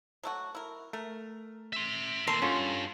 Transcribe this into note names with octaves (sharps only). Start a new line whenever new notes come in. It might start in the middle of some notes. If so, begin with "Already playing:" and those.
F#3 A3 F#4
E4 A#4
A3 A#4
E5 C6
D#2 A#2 A4 A#4 C6
G2 C#4 F4 F#4 A4